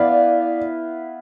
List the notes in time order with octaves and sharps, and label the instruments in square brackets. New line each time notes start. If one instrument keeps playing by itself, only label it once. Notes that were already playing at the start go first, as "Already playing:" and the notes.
Already playing: [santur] B3 E4 B4 F5 [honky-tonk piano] D5